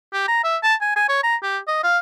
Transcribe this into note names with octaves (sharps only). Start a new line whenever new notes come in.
G4
A#5
E5
A5
G#5
G#5
C#5
A#5
G4
D#5
F5